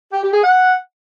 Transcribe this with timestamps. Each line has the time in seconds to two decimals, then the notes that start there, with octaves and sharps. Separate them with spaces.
0.12 G4
0.23 G4
0.33 G#4
0.43 F#5